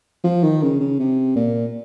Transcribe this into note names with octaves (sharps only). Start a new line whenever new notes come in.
F3
D#3
C#3
C#3
C3
A#2